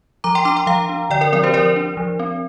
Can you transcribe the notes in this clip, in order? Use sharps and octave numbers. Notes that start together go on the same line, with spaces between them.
F3 A#5 D6
G5 C6
D4 A#5 D6
G5 C6
F3 F5 A#5
D4
D3 D5 G5
A#4 D5
F3 C4 A#4 D5
G4 C5
F3 A#4 D5
D4
F3
C4